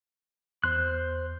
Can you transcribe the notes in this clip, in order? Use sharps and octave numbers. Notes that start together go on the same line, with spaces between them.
E2 C5 C6 F#6